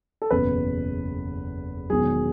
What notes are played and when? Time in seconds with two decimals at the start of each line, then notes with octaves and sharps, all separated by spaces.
0.22 A4
0.31 F#1 E2 B2 B4
1.90 E1 E2 D#3 F#3 G#4